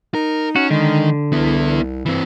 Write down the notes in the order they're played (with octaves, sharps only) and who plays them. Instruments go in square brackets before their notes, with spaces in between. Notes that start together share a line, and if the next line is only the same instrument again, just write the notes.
[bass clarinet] D#4 [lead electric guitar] A#4
[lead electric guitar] C#4 [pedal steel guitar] F#4
[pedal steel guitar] D3 [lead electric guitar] D#3 [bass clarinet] G#3
[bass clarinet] C2 [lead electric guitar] B3 E4
[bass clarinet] G2 [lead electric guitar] E3 C4